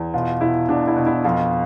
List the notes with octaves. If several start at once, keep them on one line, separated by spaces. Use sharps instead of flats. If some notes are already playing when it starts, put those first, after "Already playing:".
Already playing: E2
B2 F4
B2 E4
B2 D4
E4
B2
E4
F2 F4